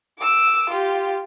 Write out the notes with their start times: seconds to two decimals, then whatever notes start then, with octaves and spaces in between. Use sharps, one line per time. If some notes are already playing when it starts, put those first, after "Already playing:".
0.19 D6 E6
0.70 F4 G4